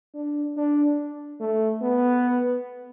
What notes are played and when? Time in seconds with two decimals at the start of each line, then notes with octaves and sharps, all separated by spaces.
0.15 D4
0.57 D4
1.40 A3
1.82 B3